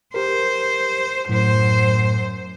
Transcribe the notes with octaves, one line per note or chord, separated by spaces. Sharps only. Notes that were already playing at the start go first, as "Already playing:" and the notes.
G4 A#4 C5
F#2 A2 C5